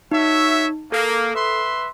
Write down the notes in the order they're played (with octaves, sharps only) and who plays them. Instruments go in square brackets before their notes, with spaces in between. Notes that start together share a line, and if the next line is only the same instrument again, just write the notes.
[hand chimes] D#4 [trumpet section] F#4 C#5 E5
[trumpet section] A#3 [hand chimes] A4
[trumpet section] B4 E5 C6